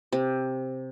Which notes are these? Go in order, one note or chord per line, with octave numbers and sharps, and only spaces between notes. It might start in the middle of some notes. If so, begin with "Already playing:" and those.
C3